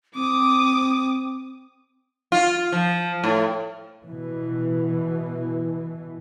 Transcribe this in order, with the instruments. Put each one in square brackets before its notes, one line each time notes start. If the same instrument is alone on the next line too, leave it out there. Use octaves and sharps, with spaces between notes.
[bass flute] C4 [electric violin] D6 D#6
[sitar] F4
F3
A2
[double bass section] B2 E3